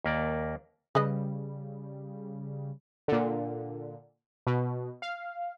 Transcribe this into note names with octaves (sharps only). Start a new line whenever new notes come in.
D#2 A#3 D5
C#3 G3 G#4 B4 D#5
A#2 D3
B2
F5